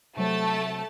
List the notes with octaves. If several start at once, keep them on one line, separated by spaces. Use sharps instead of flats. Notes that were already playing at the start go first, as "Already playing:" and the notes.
C3 F#3 A3 C5 A5